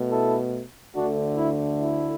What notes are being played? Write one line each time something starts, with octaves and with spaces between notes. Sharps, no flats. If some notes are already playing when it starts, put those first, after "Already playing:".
Already playing: B2 A3
E4 A4
D2 D3 A3 D4 F#4
E4
E4